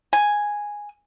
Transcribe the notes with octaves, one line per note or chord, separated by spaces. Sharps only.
G#5